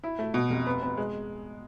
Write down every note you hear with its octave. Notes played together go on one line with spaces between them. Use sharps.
E4
A3
B2
F1
B3
B3
G#3